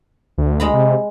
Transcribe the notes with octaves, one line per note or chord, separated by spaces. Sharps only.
D2
G#3 A#5 B5
C3